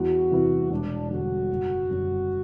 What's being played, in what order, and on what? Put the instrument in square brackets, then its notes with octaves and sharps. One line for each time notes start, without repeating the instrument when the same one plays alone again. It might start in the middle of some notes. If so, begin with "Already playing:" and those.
Already playing: [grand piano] E2 [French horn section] F#4
[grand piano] C3 E3 B3 E4
[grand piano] E1 [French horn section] D4
[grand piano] E2 D3 G3 [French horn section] F#4
[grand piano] F#1
F#2 D3 G3